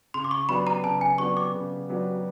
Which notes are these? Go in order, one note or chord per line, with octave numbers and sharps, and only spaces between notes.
C#3 C6
D6
C#6
F#3 B3 D4 G4 B5
A#5
C#3 A5
G#5
F#3 B3 D4 G4 C#6
D6
C#3
F#3 B3 D4 G4